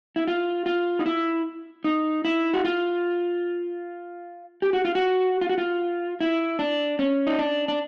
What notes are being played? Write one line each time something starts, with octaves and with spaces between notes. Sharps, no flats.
E4
F4
F4
D#4
E4
D#4
E4
F#4
F4
G4
F#4
F4
F#4
F4
F#4
F4
E4
D4
C#4
D#4
D4
D4